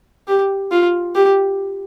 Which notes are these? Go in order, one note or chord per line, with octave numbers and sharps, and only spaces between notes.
G4
F4
G4